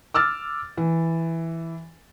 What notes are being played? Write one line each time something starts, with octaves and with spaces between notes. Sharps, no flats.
D6 E6 F6 A6
E3